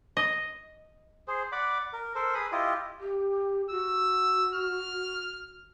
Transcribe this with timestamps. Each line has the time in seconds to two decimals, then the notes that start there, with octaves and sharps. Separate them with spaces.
0.17 D#5
1.28 G#4 C5
1.52 D5 F#5 B5 D6
1.93 A#4
2.15 A4 A#4 C5
2.35 G#4 B4 B5 D#6
2.52 E4 F4 G4 D#5
3.00 G4
3.71 F#4 E6
4.55 F6